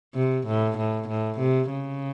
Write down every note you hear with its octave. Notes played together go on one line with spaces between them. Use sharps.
C3
A2
A2
A2
C3
C#3